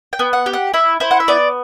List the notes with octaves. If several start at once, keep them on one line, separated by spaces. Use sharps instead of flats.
G5
B3
F#5
G4
F#5
E4 E5
E4 C5
F#5
E5
B3 D5